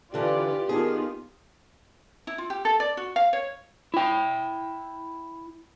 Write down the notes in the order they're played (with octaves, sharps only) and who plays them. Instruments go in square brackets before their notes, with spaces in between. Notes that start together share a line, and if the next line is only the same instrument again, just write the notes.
[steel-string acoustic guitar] D3 E3 [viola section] F4 B4 D5 [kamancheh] G4
[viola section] D#3 B3 F4 [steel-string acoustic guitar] G#4
[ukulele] E4
F4
G4
A4
D5
F#4
F5
C#5
[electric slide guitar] E4 G5